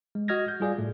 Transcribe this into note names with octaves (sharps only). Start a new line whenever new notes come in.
G#3
F#4 D#5 F6 G#6 A#6
G6
G3 F4 G#4 D5 F5
A2 A3